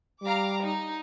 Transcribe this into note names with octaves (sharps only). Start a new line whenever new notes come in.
G3 F5 A#5 D6
D#4